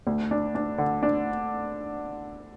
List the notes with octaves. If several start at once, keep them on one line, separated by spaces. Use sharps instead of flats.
D2
D4
D4
D3
D4